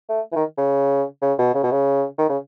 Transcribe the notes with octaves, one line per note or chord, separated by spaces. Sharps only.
A3
E3
D#3
C#3
C#3
B2
C#3
B2
C#3
D#3
C#3